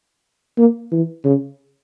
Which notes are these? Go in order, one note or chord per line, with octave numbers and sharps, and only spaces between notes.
A#3
E3
C#3